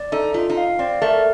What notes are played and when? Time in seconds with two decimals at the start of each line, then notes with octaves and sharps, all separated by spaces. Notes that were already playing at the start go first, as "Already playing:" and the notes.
Already playing: D5
0.12 D#4 A4
0.34 D#4 F4
0.50 D#4
0.57 F5
0.79 C4 D5
1.02 A3 A#4